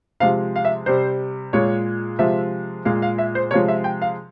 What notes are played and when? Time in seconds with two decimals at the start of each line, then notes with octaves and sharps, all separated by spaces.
0.20 C3 F3 G#3 F5
0.56 F5
0.65 E5
0.86 C3 G3 C5
1.53 A#2 G#3 C#5
2.19 C3 F3 G#3 E5
2.85 A#2 G#3 F5
3.02 F5
3.18 E5
3.35 C5
3.51 C3 F3 G#3 C#5
3.68 E5
3.84 G5
4.02 F5